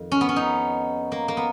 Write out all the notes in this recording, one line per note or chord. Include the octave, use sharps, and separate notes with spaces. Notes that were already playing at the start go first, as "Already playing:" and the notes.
Already playing: F2 D#3
C#4
B3
C#4
D#4
A#3
A#3
B3